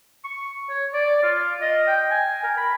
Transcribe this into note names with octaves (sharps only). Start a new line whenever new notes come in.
C#6
C#5
D5
F4
D#5
G5
G#5
A#4
B5